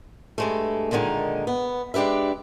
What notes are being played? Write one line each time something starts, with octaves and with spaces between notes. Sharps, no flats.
G2 G#3 A3
A#2 D3 D#3 G#3 D#4
B3
G#3 D4 G4 B4 E5